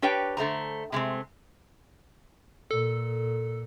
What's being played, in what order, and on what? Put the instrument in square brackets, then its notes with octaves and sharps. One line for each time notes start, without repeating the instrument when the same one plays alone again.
[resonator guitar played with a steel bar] D4 G4 B4 C#5 G5
D3 A3 C5 A#5
C3 G#3 A3 C4
[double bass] A#2 [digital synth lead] A4